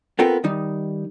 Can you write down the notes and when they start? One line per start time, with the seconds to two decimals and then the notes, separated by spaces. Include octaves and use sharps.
0.19 B3 C4 F4 A4 A#4 G5
0.44 D#3 G3 D#4